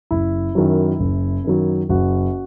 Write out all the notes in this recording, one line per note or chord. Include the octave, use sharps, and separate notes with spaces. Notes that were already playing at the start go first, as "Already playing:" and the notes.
F#1 E4
F#2 D#3 F#3
F#1
F#2 D#3 F#3
F#1 F#4